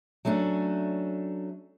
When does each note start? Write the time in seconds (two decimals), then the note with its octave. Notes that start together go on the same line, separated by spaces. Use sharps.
0.25 F#3 A3 C#4 D4